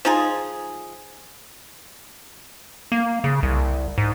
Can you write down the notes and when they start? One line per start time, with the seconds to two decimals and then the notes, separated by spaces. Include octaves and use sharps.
0.05 F3 D#4 F4 G#4
2.92 A#3
3.24 C#3
3.43 C2
3.98 G#2